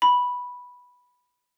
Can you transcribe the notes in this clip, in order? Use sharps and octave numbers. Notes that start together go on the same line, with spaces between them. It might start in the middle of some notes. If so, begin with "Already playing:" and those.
B5